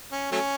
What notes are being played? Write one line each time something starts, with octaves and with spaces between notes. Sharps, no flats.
C#4
F#3 A3 C#4